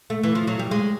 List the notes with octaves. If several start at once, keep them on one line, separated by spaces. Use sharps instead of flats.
A3
E3
F3
F#3
G3
G#3